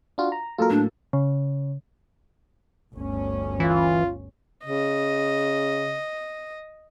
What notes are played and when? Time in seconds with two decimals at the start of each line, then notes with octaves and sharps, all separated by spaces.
0.18 D4 F4 F#4
0.32 A#5
0.58 F#3 A#3 F4 A4 A#4
0.70 A2 D4
1.13 C#3
2.93 G1 D2 C#4
3.60 E3 F4
4.65 C#3 D#5